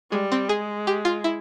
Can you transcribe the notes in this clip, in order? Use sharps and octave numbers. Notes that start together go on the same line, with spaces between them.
G3 G#3
C4
G#3 G#4
G4
F4
E4